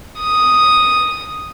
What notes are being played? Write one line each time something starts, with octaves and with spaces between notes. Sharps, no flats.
D#6